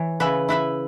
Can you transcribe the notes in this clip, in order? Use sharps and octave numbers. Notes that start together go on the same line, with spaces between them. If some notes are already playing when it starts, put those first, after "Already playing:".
Already playing: E3 C#5
C#3 B4 E5
E4 B4 E5